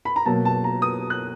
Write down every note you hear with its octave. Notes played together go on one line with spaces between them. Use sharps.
B5
A#5
B2 F#3 A#3 A5
A5
A#5
D#6
F#6